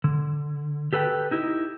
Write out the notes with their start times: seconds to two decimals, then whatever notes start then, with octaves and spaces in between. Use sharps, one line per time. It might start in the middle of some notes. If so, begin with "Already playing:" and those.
0.04 D3
0.93 G4 A4 B4 F5 G5
1.31 D#4 E4 G4 D#5